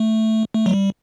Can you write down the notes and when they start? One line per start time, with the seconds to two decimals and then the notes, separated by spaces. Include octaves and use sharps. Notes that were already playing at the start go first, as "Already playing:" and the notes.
Already playing: A3
0.54 A3
0.66 F#3
0.73 G3